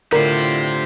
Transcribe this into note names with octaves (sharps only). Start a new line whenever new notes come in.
A2 D3 E4 F4 G4 A#4 C5